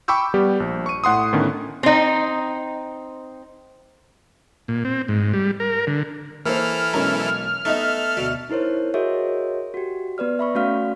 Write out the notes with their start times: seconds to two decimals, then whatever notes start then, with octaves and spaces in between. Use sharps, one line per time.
0.08 G5 B5 C#6 D6 E6 G6
0.34 G3 B3 G4
0.60 A#1
0.86 C#6 D#7
1.04 A2 F#5 C6 D#6
1.33 A2 D3 D#3 B3 C#4
1.83 C4 D#4
4.68 A#2
4.85 C4
5.08 G#2
5.34 G3
5.60 A#4
5.87 D3
6.45 E3 A#3 E4 A4 C5 F6
6.94 B1 G#3 C#4 A#4 A#5
7.65 A3 B3 D#4 A4 D#5
8.17 D2 B2
8.50 D#4 E4 A#4 C5 C#5
8.94 F#4 G#4 A#4 C#5 D#5 E5
9.74 F#4 G4
10.18 B3 B4 D5 F6
10.39 E5 B5 C#6
10.55 A3 C#4 F#4 D5 F5 F6